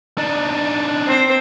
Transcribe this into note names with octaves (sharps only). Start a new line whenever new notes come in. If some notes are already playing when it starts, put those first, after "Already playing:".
D4 D#4
C4 C5